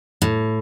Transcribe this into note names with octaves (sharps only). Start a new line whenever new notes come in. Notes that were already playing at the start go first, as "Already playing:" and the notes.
A2